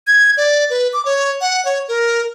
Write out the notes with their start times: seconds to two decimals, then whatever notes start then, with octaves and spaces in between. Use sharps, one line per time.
0.07 G#6
0.37 D5
0.70 B4
0.93 D6
1.05 C#5
1.41 F#5
1.65 C#5
1.88 A#4